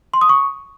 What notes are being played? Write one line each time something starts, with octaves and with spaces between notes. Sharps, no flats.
C6
D#6
C#6